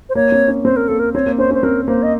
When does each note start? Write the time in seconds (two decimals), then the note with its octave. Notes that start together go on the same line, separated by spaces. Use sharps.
0.09 C5
0.15 A#3 C#5
0.32 C4
0.48 C#4
0.64 C4 C5
0.76 A#4
0.88 A#3 A4
0.99 A#4
1.14 C4 C#5
1.26 A#3
1.38 C#4 C5
1.51 C#4 C5
1.63 C4 A#4
1.88 A#3 C5
2.03 D#5